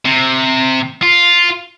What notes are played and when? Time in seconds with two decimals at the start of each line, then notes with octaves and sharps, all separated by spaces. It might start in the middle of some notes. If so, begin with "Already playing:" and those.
0.05 C3
1.03 F4